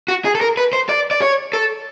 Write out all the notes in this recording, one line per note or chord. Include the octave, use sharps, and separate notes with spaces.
F#4
G#4
A4
A#4
B4
C5
D5
D5
C#5
A4